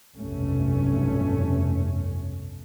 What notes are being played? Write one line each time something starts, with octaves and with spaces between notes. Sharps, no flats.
F1 B1 G2 A3 C#4